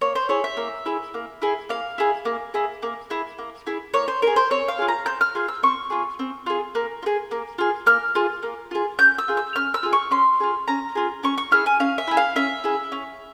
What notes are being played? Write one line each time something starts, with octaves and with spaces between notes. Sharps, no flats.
A#3 C#5
C5
E4 G#4 C#5
E5
A#3
E4 G#4
A#3
E4 G#4
A#3 F5
E4 G#4
A#3
E4 G#4
A#3
E4 G#4
A#3
E4 G#4
A#3 C#5
C5
E4 G#4 A#4
C5
C4 C#5
F5
F4 G#4
A#5
C4 G6
F6
F4 G#4
E6
C4 C#6
F4 G#4
C4
F4 G#4
A#3
F4
G#4
A#3
F4 G#4
A#3 F6
F4 G#4
A#3
F4 G#4
C#4 G6
E6
F4 G#4
E6
C#4 F6
E6
F4 G#4
C#6
C#4 C6
F4 G#4
C#4 A#5
F4 G#4
C#4 C#6
C#6
E4 G#4 F6
G#5
C#4 F5
E5
E4 G#4
F5
C#4 E5
E4 G#4
C#4